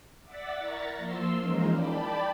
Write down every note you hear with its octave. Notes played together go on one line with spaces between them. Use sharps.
D5 E5 F#5 A6 B6
E4 A#4 A#5 C#6 A6
F3 A#3 C6 E6
E3 G#3 C#4 D#4 F4 A#4
D5 G5 A5 B5